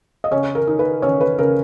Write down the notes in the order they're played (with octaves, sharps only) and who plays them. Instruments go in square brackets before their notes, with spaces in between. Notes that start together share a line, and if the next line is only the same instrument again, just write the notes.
[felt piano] D#5
C#3 C#4 C#5
A#4
D#4
B4
C#3 C#4 C#5
B4
C#3 A#4